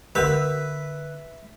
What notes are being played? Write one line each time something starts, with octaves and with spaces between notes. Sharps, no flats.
D3 C#4 G4 A#4 B4 E5 F#5